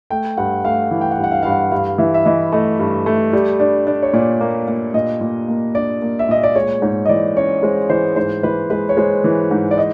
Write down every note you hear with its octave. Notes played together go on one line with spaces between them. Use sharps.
A3 G5
G2 F#5
A3 F5
E3
G5
F#5
G2
F#5
F5
G2 F5
F#5
G2 F5
E3 E5
E5
E3 D#5
A3 D#5
G2
A3
G3
D4
D4
C#5
A#2 D5
A#3
A#3
A#2 D#5
A#2
A#3
D4 D5
A#3
E5
A#2 D#5
D5
G#3 C#5
G#2 C#5
D#5
E3 D5
C#4 C#5
G#3 C5
E3 C5
G#2 C5
E3 B4
G#3 B4
C#5
G#3 C5
E3
G#2
D5
D#5